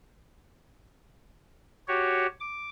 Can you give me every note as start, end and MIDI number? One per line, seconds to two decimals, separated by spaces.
1.88 2.27 66
1.88 2.27 67
1.88 2.27 73
2.40 2.70 86